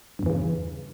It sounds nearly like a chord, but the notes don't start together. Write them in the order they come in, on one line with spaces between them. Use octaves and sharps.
G2 E2 E3 C#3